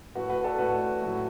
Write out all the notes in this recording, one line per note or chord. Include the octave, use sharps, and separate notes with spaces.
A2 A3 F#4 B4
F#4 B4
A4 D5
A2 A3 F#4 B4
A2 F#3 A3